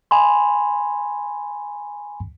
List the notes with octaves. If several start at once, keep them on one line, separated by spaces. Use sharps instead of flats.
G#5 B5 C6